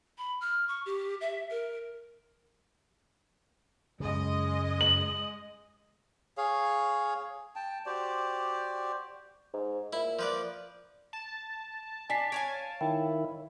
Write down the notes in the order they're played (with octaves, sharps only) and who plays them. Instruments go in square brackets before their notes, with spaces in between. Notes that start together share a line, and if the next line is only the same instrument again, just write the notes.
[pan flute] B5
F6
C#6
G4
E5
A#4
[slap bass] F#2 C#3 [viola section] G#3 D#5
[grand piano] F#7
[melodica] G#4 C#5 F5
G5 A5
F#4 G4 C5 D5
[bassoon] G#2
[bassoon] A#2 [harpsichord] E4
[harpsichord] F3 B4 D5
[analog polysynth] A5
[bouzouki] D4 [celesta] G#5 B6 C7
[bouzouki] C#5 F5 G#5 [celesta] D7
[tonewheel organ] D#3 E4 [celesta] G5